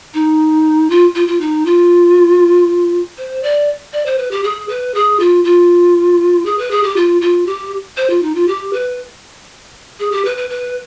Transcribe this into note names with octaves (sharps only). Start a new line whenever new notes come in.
D#4
F4
F4
F4
D#4
F4
C5
D5
D5
C5
B4
G4
G#4
B4
G#4
F4
F4
G#4
B4
G#4
G4
F4
F4
G4
C5
F4
D#4
F4
G4
B4
G#4
G4
B4
B4
B4